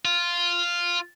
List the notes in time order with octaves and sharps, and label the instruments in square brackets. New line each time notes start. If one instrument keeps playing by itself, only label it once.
[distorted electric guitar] F4